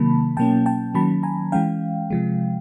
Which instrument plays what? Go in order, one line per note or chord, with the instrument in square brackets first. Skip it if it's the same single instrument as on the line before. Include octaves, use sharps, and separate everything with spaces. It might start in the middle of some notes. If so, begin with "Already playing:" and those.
Already playing: [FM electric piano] C3 D#3 F#3 A#3 A5 B5
B2 F#3 A#3 C#4 G5 A5
G5 A5
D#3 F#3 A#3 C#4 A5 B5
G#5 A#5
E3 G#3 C#4 F5 G5
C3 F3 G#3